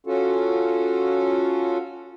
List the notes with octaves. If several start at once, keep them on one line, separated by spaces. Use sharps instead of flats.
C#4 F4 F#4 A4